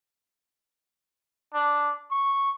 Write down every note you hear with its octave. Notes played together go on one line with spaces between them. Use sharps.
D4
C#6